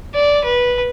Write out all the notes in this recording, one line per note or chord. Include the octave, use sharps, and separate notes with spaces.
D5
B4